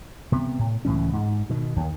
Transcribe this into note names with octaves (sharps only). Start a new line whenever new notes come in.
C3 B3
A2
C#2 A2 E3 C#4
G#2
B2 D#3
D#2 D#3